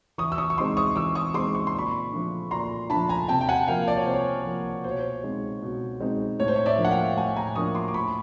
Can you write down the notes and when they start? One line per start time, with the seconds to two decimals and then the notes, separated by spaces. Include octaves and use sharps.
0.18 E3 C#6 D#6
0.32 E6
0.38 C#6 D#6
0.50 C#6
0.58 G#3 C4 D#4 C6 D6
0.77 C#6 D#6
0.96 E3 D6 E6
1.15 C#6 D#6
1.34 G#3 C4 D#4 C6 D6
1.55 C#6
1.67 C6
1.74 A#2 B5 C#6
2.13 F3 A3 D4
2.51 A#2 A#5 C6
2.90 F3 A3 D4 A5 B5
3.09 G#5 A#5
3.28 C3 G5 A5
3.41 G5
3.49 F#5 G#5
3.67 F3 A#3 F5 G5
3.88 D5
3.96 C#5
4.05 C3 C5
4.14 C#5
4.45 F3 A#3
4.84 B2 C5
4.91 C#5
4.99 C5
5.24 G#3 C4 D#4
5.63 B2
6.00 G#3 C4 D#4
6.40 A2 C#5
6.48 C5
6.56 C#5
6.66 D5 E5
6.78 F3 A#3 D4
6.85 F#5
6.91 F5 G5
7.17 A2 F#5 G#5
7.36 G#5 A#5
7.55 F3 A#3 D4 C#6 D#6
7.75 C6 D6
7.88 D6
7.94 A2 B5 C#6